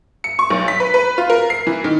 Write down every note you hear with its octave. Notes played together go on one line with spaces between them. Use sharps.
C#7
C#6
B1
B6
B4
B4
F4
A#4
C7
E3
D#3